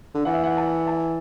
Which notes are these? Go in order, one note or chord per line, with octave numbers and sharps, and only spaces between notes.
D3
E3 F#5
E5
F#5
A5
A5